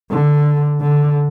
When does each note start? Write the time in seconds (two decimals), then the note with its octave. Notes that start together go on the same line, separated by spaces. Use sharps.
0.11 D3
0.81 D3